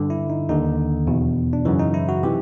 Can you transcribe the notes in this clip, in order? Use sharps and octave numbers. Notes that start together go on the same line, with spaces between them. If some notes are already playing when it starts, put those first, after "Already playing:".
Already playing: G2 D3
E4
D#4
D#2 D3 D#4
E2 B2
D4
F#2 C#3 E3 D#4
D#4
E4
F#4
C3 E3 G4